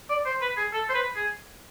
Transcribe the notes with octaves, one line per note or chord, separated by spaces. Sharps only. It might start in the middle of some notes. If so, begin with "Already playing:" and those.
D5
C5
B4
G#4
A4
C5
B4
G#4